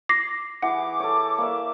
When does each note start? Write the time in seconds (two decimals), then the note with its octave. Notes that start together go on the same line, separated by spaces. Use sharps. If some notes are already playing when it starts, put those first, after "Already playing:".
0.09 D6 A#6 C7
0.63 E3 G#4 F#5 D6
1.00 A4 C#5
1.38 A#3 D5 E5